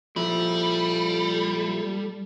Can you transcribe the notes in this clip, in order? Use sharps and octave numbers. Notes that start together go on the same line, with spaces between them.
A#2 F3 G3 E4 A4